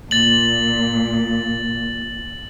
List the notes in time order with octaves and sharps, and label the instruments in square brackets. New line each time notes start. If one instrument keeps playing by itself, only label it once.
[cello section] A#2 [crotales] A6 F#7